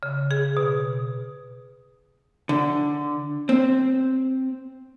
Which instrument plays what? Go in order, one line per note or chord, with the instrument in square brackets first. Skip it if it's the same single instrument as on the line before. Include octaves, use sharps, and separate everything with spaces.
[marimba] C#3
G#4
B2
[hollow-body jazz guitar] D3
C4